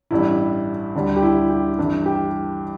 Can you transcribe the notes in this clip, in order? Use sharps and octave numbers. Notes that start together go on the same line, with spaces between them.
A1 G2 G3 E4
D2 D3 G3
G4
E4
G4
G1 G2 E3
G4